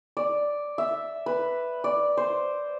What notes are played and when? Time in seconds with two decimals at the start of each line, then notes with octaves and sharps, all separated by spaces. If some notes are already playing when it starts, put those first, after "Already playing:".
0.17 D5
0.78 E5
1.26 B4
1.84 D5
2.17 C5